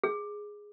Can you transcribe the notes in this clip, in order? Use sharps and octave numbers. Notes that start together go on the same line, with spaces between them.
G#4